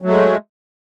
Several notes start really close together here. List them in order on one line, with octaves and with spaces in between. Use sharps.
F#3 A3 G#3